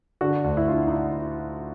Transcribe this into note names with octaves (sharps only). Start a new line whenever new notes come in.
D3 F#4
D2
E4
D3 F4
D#4
E4